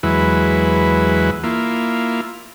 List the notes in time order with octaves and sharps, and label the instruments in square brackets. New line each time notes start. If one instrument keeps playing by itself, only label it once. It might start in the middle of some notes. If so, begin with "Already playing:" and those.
[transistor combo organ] E2 F#3 G#3 E4 B4
A#3 E4 F4